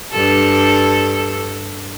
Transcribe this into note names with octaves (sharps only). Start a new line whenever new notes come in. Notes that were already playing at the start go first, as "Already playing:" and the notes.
G2 A4